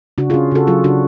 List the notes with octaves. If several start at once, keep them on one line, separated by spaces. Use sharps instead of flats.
C#3 D4 F#4
C#4 F4 G#4
C#3 F#4 A4
F#3 F4 G#4
C#3 D4 F#4